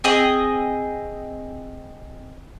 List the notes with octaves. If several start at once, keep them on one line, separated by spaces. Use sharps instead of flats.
C4 G#4 D#5